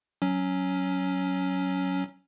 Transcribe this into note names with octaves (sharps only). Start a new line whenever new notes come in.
F#3 C#4